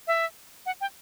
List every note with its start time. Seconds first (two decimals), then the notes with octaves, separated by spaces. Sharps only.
0.07 E5
0.66 F#5
0.81 G5